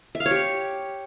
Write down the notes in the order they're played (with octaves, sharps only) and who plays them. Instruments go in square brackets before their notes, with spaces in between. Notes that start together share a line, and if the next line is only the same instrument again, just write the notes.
[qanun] E5
F5
C#5
G4